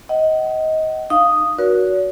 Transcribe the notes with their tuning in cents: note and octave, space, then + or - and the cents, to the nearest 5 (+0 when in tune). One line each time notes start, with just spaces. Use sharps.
D#5 +20 F#5 +30
D#4 -35 F5 +0 D#6 +0
F#4 +0 A#4 +45 C#5 +45